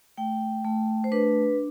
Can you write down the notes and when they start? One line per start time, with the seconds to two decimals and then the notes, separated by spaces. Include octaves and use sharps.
0.17 A3 G5
0.64 A3
1.04 C5
1.12 D4 B4